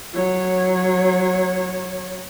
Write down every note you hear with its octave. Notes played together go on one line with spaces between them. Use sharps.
F#3 C#5